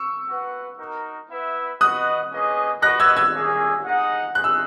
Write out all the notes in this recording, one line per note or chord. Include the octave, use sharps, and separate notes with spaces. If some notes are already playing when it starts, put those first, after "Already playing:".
Already playing: C#6 E6
F#4 B4 F#5
D#4 F#4 A#4
B3 E4 B4 E5
F#4 B4 D#5 F#5 D#6 F#6
A#3 C#4 G#4 B4 D#5
F#4 B4 D#5 F#6 A#6
E6 G#6
E6 G#6
A#3 C#4 G#4
D#4 G#4 D#5 F#5
D#4 G#4 F#6
E6